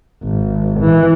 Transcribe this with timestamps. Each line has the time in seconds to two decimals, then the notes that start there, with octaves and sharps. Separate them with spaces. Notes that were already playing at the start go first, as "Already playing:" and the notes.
0.23 G#1
0.80 E3